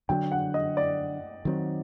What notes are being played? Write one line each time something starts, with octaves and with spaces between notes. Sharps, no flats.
D3 F#3 A#3 D4 G5
F#5
D#5
D5
D#3 F#3 C4